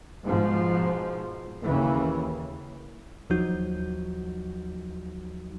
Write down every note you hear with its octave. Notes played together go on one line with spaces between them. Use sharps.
G#2 B2 F3
D#2 C#3 E3
D#2 F3 F#3 D#4 F#4 G6